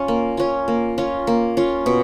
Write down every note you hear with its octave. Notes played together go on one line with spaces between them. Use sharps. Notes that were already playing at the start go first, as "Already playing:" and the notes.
Already playing: C#4 F4
A#3
C#4 F4
A#3
C#4 F4
A#3
C#4 F4
B2